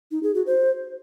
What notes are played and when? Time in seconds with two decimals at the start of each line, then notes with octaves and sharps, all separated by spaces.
0.11 D#4
0.23 G#4
0.35 F#4
0.47 C5